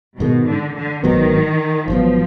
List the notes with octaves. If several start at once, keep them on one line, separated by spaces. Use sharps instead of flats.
G#2 B2 D#3 G#3
D3
D3
G#1 G#2 D#3 F#3 B3
G#1 G#2 F3 F#3 B3